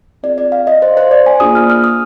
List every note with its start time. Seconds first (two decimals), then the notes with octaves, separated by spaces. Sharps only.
0.23 C4 F4 G#4 D5
0.38 D5
0.52 F5
0.67 D#5
0.82 C5
0.97 C5
1.11 D5
1.26 G#5
1.40 A#3 D4 F4 G#4 D#6
1.55 F6
1.70 F6
1.84 D#6